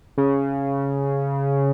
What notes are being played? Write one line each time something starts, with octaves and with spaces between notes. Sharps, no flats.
C#3